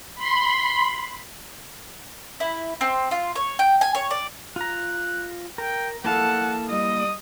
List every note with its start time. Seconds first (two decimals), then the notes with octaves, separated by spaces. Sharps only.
0.15 B5 C6
2.40 E4
2.81 C4
3.11 F4
3.35 C#5
3.59 G5
3.81 G#5
3.95 C#5
4.11 D5
4.56 F4 A#5 F#6
5.58 A#4 G5
6.05 A#3 E4 A4 F5 F#5 A5
6.69 G3 D#5 D#6